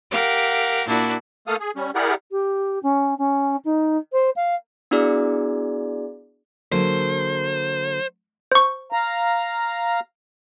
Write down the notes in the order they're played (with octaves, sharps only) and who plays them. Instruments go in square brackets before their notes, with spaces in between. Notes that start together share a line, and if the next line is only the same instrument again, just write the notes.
[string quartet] G4 A#4 F5 F#5
A#2 A#3 D4 E4 F#4
[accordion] A3 A#3 A4 F5 D#6
G#4
G3 C#4
E4 G4 G#4 A#4 D5 F#5
[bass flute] G4
C#4
C#4
D#4
C5
F5
[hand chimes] B3 D4 E4 F#4 G#4 D5
[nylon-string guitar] D3 F#3 A#3 [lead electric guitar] C5
[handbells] C5 C#6
[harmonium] F5 A#5